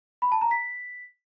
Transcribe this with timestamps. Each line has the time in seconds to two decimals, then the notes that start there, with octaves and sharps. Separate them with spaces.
0.22 B5
0.32 A5
0.41 A#5
0.51 B6